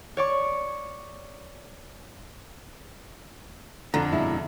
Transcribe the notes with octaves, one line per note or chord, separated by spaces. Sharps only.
C#5 D5 C#6
F2 D3 A#5
B2 G#3 E4